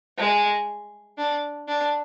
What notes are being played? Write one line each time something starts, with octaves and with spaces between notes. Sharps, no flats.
G#3
D4
D4